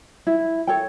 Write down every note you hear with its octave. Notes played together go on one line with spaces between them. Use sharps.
E4
A4 C#5 G5